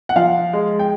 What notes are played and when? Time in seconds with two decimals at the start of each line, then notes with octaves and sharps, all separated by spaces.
0.09 F#5
0.16 F3 F5
0.53 G#3
0.79 G5